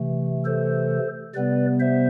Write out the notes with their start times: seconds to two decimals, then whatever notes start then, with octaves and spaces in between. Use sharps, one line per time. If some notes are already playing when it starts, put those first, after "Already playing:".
Already playing: C3 E3 A3
0.45 A4 C5
1.34 C3 G3 B3 B4 D5
1.80 C5 E5